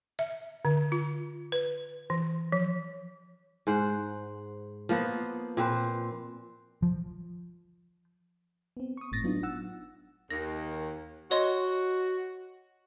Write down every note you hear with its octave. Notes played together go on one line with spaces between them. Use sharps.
E5
D3
F4
B4
E3
F3
G#2 C5 F#5
F3 A#3 B3 F#5
A#2 C4 B4 C5
F3
B3 C4
C#6 D#6
G1 A2 A6 A#6
F#3 B3 D4 D#4 F4
F#5 E6
D#2 A#6
F#4 C#5 D#5 C6